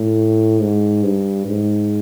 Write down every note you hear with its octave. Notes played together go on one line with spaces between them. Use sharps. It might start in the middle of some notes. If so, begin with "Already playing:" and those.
Already playing: A2
G#2
G2
G#2